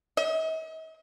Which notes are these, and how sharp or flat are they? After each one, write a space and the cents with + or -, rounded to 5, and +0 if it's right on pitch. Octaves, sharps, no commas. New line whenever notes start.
D#5 +45